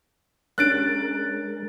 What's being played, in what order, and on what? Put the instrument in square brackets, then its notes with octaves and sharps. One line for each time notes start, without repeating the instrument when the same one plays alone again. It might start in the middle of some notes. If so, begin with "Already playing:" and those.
[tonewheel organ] G#3 A#4 [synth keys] C#4 D4 C#5 [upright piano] F#6 A6 D7